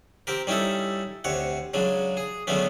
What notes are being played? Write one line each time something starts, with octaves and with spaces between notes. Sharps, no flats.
C4 G4 A#4
G3 C#4 D#4 E4 A4
D2 C3 C#5 F#5
C#3 F#3 G#3 D4
G#4
D3 F#3 G#3 A3 B3 C#4